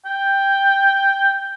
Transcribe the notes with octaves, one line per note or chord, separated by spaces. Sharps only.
G5